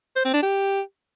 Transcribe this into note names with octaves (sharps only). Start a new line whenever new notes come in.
C5
C4
D4
G4